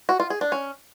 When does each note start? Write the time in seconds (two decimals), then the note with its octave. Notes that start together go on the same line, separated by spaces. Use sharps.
0.09 F#4
0.20 F4
0.30 G#4
0.41 D4
0.52 C#4